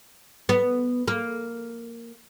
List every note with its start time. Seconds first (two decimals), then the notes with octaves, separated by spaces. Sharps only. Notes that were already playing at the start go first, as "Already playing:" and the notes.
0.49 B3
1.08 A#3